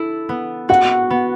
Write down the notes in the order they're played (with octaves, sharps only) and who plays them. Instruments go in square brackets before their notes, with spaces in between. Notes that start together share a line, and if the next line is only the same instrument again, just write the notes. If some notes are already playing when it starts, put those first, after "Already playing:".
Already playing: [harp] E4 A4
B3
[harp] F#4 [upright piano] F#5
[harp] B3